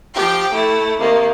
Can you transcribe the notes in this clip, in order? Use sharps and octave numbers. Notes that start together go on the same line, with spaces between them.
F3 G4 G5
A3 E4
C3 D#3 A#3